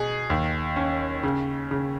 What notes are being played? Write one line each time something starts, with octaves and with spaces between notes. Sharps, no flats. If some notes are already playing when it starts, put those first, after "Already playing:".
Already playing: B2 G#4
D#2
C#4
C#3
C#3